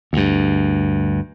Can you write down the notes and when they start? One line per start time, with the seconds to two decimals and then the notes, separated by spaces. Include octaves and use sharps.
0.13 D2 G2